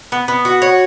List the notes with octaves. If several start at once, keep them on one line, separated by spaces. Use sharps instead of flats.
B3
B3
F#4
C#5